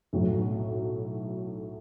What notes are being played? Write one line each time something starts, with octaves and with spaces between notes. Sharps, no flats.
B1 A2 F#3